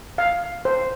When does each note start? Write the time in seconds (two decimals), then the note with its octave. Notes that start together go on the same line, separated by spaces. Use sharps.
0.18 F5
0.65 C5